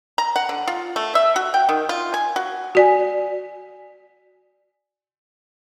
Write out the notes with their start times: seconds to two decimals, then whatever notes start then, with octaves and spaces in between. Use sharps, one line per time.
0.18 A#5
0.36 F#5
0.49 D3
0.68 F4
0.96 A3
1.15 E5
1.36 F#4
1.54 G5
1.69 D#3
1.89 F4
2.14 G#5
2.36 F#4
2.75 F#4 D5 G#5